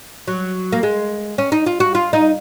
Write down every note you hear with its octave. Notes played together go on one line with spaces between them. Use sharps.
F#3
A#3
G#3
C#4
D#4
F4
F#4
F4
D#4